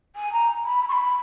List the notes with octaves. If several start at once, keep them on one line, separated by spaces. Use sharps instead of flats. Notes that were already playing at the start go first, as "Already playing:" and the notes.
G#5
A#5
B5
C#6
B5